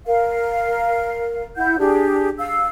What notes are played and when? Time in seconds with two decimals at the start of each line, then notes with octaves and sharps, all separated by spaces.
0.07 A#4 F5
1.57 E4 F#5 G6
1.79 D4 G4 G#4
2.38 F5 E6